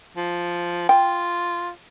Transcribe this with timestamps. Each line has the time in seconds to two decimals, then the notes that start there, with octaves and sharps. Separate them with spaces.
0.16 F3
0.89 F4 G5